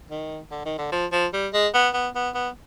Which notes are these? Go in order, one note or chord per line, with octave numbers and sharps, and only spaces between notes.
D#3
D3
D#3
D3
F3
F3
G3
G#3
B3
B3
B3
B3